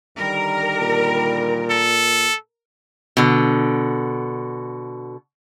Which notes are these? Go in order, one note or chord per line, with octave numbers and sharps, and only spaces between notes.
D3 D#3 G3 A#4
A#2
A4
B2 D3